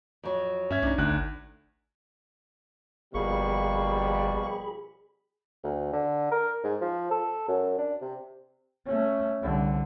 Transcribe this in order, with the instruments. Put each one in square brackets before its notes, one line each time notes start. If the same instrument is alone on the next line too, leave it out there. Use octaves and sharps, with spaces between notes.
[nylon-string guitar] F2 F#3
[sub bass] G2 [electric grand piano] C#4 E5 G#6
[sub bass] C2 [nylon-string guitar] D4 D#4
[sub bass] G#1 [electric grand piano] D2 F#6
[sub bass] G1 [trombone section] B2 F3 G3 [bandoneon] A#3 C#6 [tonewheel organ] G#4 B5
[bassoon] D2
D3
A#4
G#2
F3
A4
F#2
D4
C3
[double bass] A3 C#4
C2 D3